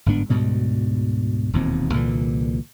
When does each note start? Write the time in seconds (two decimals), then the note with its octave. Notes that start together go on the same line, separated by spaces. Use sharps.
0.06 G1 G#2 B3 D4
0.29 D2 G#2 B2 G3
1.53 E1 D#2 A#2 C4
1.94 C2 A#2 D3 E3